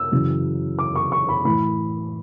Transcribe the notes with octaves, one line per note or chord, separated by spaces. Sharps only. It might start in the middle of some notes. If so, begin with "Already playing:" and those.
Already playing: E6
F#2 C#3 E3
D6
C#6
C#6
B5
A2 E3 B5